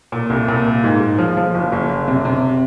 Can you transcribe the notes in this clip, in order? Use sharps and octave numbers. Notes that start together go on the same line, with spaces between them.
A#2
C2
A#2
A#3
G#2
G#2
F3
F3
F#1
F#1
F#1
C3
C3